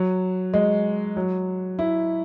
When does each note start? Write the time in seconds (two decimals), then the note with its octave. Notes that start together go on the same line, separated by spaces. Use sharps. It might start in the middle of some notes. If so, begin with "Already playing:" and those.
Already playing: F#3
0.54 G#3
1.17 F#3
1.79 E4